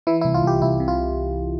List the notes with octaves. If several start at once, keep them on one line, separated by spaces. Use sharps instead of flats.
E3 E4
C2 E4
F4
C2 G4
C2 E4
C3
F4